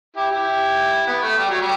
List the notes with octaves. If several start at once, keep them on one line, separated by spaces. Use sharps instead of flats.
E4 G4
E4 G4
B3
A3
G3
F#3
G3